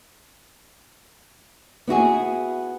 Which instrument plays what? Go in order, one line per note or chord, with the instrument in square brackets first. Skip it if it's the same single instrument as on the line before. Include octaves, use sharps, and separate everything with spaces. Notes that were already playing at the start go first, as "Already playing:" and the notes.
[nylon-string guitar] B3 E4 F#4 G#4